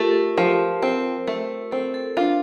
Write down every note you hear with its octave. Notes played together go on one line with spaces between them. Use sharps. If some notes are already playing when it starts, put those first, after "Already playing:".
Already playing: A3 F4 G4 A4 A#4
F3
C4
A3
C4 A4
A4
D4 F4